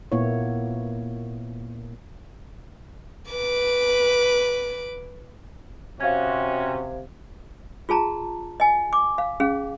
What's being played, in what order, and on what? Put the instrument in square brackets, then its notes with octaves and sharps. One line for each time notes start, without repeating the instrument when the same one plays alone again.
[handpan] A#2 A#3 B3 E4 C#5
[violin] B4 D6
[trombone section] C3 C5 [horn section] C#4 F#4 [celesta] F5 G#6
[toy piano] F4 G#4 A5 A#5
D#5 G#5
D6
F5
C#4 G#4 F5